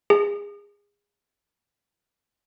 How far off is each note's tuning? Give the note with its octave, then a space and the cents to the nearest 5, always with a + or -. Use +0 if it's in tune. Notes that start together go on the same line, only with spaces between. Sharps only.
G#4 -25